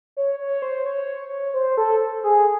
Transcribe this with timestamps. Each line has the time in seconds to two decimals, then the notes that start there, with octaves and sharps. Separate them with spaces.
0.17 C#5
0.40 C#5
0.62 C5
0.86 C#5
1.54 C5
1.77 A4
2.00 A4
2.24 G#4